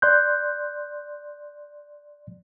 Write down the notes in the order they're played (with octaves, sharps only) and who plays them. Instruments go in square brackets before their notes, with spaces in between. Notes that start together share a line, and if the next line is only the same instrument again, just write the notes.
[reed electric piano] D5 C6 F#6 G6